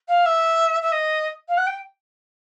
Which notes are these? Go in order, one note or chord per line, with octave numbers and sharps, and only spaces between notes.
F5
E5
E5
D#5
F5
F#5
G5